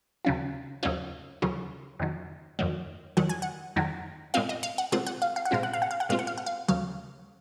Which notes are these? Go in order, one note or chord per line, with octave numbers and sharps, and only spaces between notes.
D#2 C#3 F#3 C#4 F4
D#2 C#3 F#3 C#4 F4
D#2 C#3 F#3 C#4 F4
F2 D#3 F#3
F2 D#3 F#3
F2 D#3 F#3 F#5
G#5
F#5
F2 D#3 F#3
A#2 G#3 C4 F4 F5
D#5
F5
F#5
A#2 G#3 C4 F4 F#5
F#5
F5
F5
F#5
A#2 G#3 C4 F4 F5
F#5
F5
F#5
F5
F#5
A#2 G#3 C4 F4 F5
F#5
F5
F#5
F5
D#2 C#3 F#3 F5